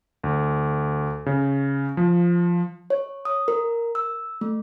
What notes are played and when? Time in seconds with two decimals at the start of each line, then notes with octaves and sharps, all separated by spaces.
0.24 D2
1.26 C#3
1.97 F3
2.90 C#5
3.25 D#6
3.48 A#4
3.95 E6
4.41 A3